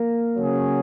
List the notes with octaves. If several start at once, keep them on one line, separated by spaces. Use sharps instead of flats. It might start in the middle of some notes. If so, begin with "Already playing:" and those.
Already playing: A#3 A#4
C#3 F#3 C#4 G#4